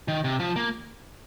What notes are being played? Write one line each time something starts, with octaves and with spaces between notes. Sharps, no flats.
D#3
C3
F3
A#3